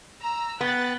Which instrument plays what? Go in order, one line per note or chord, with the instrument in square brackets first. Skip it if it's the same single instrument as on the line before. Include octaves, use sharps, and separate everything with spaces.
[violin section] A#5 E6
[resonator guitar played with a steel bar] B3 [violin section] G5 F#6 A6